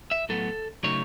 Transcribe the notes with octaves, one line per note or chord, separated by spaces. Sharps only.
E5
A2 F#3 B3 A4
C#3 F#3 A3 D#4 C#5